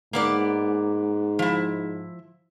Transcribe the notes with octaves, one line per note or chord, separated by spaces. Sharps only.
G#2 A#3 B3 D5
F3 E4